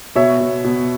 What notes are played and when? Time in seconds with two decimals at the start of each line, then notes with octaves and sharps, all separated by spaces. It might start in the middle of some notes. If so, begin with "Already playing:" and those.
0.16 B2 C#5 E5
0.40 B2
0.64 B2